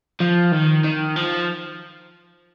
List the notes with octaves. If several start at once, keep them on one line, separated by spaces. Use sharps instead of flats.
F3
D#3
D#3
F3